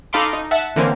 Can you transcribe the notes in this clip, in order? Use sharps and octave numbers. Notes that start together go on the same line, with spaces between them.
D#4 A4 F5 B5 C6 D6
D#4
E5 F#5 A5
D3 E3 A#3 C4 C#4